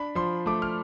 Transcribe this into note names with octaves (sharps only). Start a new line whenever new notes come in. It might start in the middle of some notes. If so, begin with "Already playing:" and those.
Already playing: D4 B5
F3 C6
A3 D6
F6